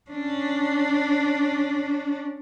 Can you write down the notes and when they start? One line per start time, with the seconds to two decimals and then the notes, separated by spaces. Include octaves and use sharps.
0.11 C#4 D4